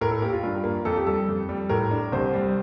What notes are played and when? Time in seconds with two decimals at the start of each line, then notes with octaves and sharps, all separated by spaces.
0.01 A2 A#4
0.11 A4
0.22 A#3 G4
0.33 F4
0.43 G2
0.64 A#3
0.85 F2 A4
0.96 G4
1.07 G3 A4
1.28 F2
1.49 G3
1.69 A2 A#4
1.91 D4
2.12 C2 C5
2.34 G3